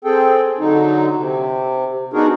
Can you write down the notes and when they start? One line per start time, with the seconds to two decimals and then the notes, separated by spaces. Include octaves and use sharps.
0.04 C4 G#4 A4 G5
0.59 D3 F#3 D#4
1.17 C3
2.13 B3 D4 D#4 F#4 G#4 A#4